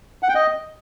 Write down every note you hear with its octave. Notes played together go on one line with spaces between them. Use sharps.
F#5
G5
D#5